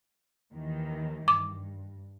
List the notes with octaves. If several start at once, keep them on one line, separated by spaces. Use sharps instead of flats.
D#2 D#3 E3
G2 D6